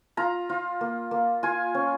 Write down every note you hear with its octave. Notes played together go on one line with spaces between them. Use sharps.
F4 A#5
F4
A#3
A#3
F4 G#5
C#4